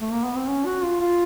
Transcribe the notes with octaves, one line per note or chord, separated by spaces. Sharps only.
A3
A#3
B3
C4
C#4
F#4
F4
F4